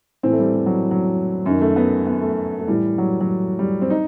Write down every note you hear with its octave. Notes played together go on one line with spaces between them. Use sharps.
A2 E3 C4
A3
G3
G3
F#3
F#3
F#2 D#3
A3
B3
B3
A3
A3
A2 E3 G3
F#3
F#3
G3
C4
D#4